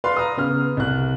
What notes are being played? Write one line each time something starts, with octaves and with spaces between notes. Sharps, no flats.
B4 D5 F5 C6
A#5 D#6
C#3 B3 F6
C2 F#6